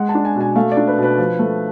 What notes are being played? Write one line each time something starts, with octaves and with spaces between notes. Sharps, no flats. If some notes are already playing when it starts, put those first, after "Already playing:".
Already playing: G#3 F#5
A5
D4
G#5
B2
G#5
A3 F5
D5
D4
B4
B2
B4
F3
A3